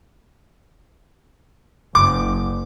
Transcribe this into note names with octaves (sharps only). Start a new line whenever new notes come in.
F#1 D6